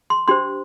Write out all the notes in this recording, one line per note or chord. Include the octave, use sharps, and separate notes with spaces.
C6
D4 G4 C5 C6